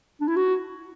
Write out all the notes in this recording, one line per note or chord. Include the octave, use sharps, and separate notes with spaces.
D4
E4
F#4